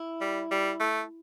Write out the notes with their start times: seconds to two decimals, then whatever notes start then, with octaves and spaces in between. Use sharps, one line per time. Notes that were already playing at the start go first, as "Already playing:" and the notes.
Already playing: E4
0.21 G3
0.51 G3
0.80 A3